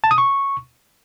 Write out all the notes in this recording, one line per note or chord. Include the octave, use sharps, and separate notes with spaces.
A5
D#6
C#6